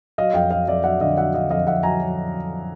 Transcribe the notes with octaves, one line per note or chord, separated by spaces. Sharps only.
F#3 D#5 F5
F2 F5 G5
F#3 D#5 F5
F2 D5 E5
F#3 E5 F#5
D3 D#5 F5
F#3 E5 F#5
D3 D#5 F5
F2 D#5 F5
F2 E5 F#5
F#3 G#5 A#5
F#3